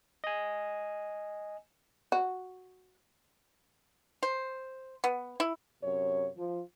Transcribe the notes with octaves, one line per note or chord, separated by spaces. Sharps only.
D#5 G#5
F#4
C5
B3
E4
F#2 C3 C#5
F3